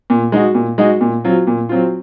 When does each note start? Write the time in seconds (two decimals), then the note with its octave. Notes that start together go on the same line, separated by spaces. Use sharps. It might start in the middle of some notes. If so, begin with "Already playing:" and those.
0.10 A#2
0.32 G#3 D#4 F#4
0.55 A#2
0.78 G#3 D#4 F#4
1.01 A#2
1.25 F#3 C4 F4
1.47 A#2
1.69 F#3 C4 F4